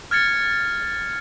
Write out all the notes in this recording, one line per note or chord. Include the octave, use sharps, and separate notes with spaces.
F6 G#6 A6 C#7